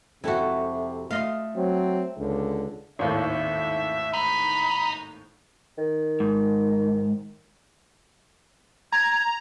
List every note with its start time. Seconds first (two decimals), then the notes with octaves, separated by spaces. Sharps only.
0.24 F2 C3 E4 F#4 A4 E5
1.11 A3 F4 D#5 F5
1.56 F#3 C4
2.18 C#2 D3
2.99 G#1 D#2 A2 E5
4.13 D#4 B5
5.78 D#3
6.20 G#2
8.92 A#5 G#6